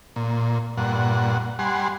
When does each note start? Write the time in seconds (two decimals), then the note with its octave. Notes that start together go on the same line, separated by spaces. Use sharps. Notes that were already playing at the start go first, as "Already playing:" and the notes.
0.16 A#2
0.78 G2 A#2 F#5
1.59 G3 F#5 G#5 C6